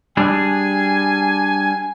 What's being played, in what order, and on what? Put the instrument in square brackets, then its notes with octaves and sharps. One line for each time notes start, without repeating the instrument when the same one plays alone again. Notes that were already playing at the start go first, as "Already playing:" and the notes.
[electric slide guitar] G3 D4 G#4 [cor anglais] G#5